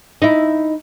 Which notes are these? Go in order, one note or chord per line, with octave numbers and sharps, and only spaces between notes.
D#4 E4